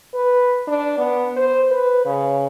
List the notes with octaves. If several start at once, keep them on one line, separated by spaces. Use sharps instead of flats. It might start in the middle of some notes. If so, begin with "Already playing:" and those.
B4
D4
B3
C5
B4
C#3